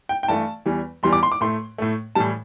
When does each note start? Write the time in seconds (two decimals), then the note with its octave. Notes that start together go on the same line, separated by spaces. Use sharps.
0.09 G5
0.23 G5
0.28 G2 E3 A3 A5
0.66 E2 E3 G3
1.03 E2 E3 G3 C6
1.13 D6
1.23 C6
1.32 D6
1.41 A2 A3 C6
1.78 A2 A3
2.15 A2 E3 G3 A5